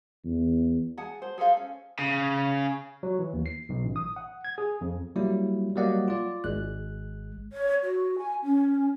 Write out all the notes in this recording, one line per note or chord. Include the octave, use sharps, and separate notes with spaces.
E2
G#4 F#5 A5
C5
G#4 A4 C5 F5
C#4
C#3
F#3
E3
D#2
C7
B1
A1
D#6
F#5
G#6
G#4
F2
F#3 G3 A#3 E4
F#3 G3 A#3 D5 D#5 F#5
F4 D5
G#1 G#3 F#6
C#5
F#4
G#5
C#4